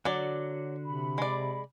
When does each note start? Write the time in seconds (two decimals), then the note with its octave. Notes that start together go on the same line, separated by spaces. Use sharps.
0.05 D3 F#3 F#4 D5
0.84 C3 B5
1.18 G#3 D5